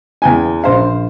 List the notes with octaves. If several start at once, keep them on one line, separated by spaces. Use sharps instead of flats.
E2 G5 G#5
A#1 C5 F5